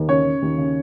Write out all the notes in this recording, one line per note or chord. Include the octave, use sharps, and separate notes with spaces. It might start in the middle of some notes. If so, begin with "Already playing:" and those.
Already playing: D#2
C#3 C#5
C#3
D#2
C#3